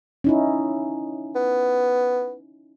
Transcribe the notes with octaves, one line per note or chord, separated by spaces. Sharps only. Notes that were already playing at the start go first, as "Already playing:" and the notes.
C#4 D#4 E4
B3